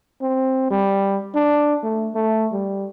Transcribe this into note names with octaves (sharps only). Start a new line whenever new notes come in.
C4
G3
D4
A3
A3
G3